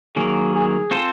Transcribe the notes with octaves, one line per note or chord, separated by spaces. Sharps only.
D#3 F#3 A#3 G#4
G#4
C4 F4 A4 C5